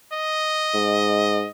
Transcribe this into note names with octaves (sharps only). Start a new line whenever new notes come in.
D#5
G#2